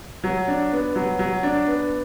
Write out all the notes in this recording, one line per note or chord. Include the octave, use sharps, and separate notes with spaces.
F#3
D4
B3
F#3
F#3
D4
B3